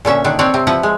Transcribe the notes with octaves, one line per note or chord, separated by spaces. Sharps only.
A#2 D3 C#4 E5
D3 D#3 D4
C4 D4 C#5 D5
C3 C4
F3 E4 B4 F#5
G#3